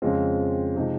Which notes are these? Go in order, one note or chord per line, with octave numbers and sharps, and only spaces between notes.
F2 C#3 G#3 C4 F4
C3 F3 G#3 D#4